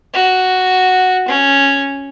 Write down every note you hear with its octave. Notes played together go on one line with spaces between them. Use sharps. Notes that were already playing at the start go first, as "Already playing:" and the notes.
F#4
C#4